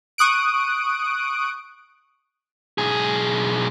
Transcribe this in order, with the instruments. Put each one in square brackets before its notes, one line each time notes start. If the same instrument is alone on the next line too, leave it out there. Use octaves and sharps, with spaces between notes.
[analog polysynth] C#6 D#6 F#6 D7
[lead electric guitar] B1 G#4